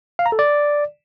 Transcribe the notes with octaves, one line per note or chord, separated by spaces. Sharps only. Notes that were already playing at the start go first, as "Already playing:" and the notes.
F5
A#5
A4
D5